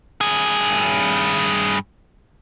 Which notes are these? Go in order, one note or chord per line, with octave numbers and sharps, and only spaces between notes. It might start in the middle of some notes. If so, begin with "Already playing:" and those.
G2 G#4